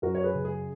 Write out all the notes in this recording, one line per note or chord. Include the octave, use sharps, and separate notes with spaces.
F#2 F#4 A#4
C#5
G#4 B4
C#3
G#4